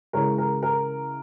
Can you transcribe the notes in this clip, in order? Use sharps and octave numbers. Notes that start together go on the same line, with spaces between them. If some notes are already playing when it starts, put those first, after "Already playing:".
C#3 E3 G#3 A#4 C#5
A#4
A#4